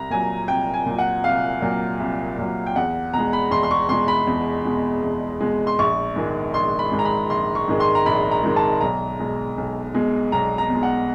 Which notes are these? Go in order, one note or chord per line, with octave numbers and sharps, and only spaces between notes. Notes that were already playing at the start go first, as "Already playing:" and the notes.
Already playing: C2 A#5
A#2 F#3 G#5
C2 G5
G#5
A#2 F#3
F#5
C2 F5
A#2 F#3
C2
A#2 F#3
G5
E2 F#5
B2 G#3 A#5
B5
E2 C6
C6
C#6
B2 G#3 C6
B5
E2
B2 G#3
E2
B2 G#3
C6
A#1 C#6
G#2 D#3 G#3
A#1 C6
B5
G#2 D#3 G#3
A#5
B5
A#1 C6
C#6
G#2 D#3 G#3
C6
A#5
A#1 B5
A#5
G#2 D#3 G#3
A5
B1 A#5
B2 G#3
B1
B2 G#3
B1 A#5
A#5
B2 G#3
F#5